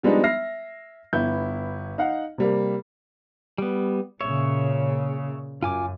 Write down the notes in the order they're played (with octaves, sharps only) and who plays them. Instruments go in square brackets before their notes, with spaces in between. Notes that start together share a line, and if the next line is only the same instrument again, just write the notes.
[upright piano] F3 G3 G#3 B3 D4 D#4
E5 F6 A#6 C7
G1 B3 E4 G6
D#4 F5 F#5
C3 G3 A#3
[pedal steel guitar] G3 B3
[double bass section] A#2 C#3 [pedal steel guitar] C#5 E5
[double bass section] F#2 [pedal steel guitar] F4 G#5 D6